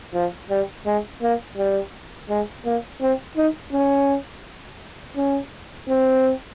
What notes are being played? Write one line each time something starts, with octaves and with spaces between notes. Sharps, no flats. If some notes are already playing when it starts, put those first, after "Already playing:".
F3
G3
G#3
A#3
G3
G#3
A#3
C4
D#4
C#4
C#4
C4